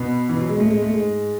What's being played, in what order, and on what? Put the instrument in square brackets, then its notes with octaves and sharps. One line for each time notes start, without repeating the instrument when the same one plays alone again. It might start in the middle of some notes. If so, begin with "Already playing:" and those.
Already playing: [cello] B2 [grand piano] B3
[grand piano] E3
F#3
G#3
[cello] A2 [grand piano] A3
[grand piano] G#3
A3
[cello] G#2 [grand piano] G#3